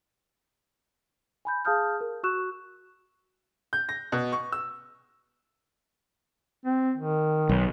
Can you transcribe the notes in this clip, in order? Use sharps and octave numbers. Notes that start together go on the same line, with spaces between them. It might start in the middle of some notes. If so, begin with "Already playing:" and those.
G#5 B5 G6
G#4 F5 A5 D#6 F6 G6
A#4
F#4 C#6 E6 F#6 E7
G6
A#6
B2
C#6
E6
C4
D#3
B1